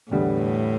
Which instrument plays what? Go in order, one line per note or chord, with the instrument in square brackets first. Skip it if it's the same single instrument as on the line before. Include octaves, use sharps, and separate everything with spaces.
[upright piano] E2 D3 G3 B3 [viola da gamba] A2